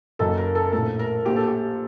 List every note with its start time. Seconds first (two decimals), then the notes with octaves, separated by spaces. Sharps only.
0.19 F#1 F#2 D#3 A4
0.38 A#4
0.55 A4
0.73 A#1 A2 A4
0.99 A#4
1.25 A#1 A#2 G4
1.36 A4
1.47 G4